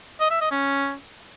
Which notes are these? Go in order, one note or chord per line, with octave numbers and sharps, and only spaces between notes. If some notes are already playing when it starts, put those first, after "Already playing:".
D#5
E5
D#5
C#4